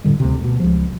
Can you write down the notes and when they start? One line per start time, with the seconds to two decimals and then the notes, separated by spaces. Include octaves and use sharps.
0.04 F2 A2 D3 G3
0.20 D2 C3
0.44 B2
0.60 C#2 F3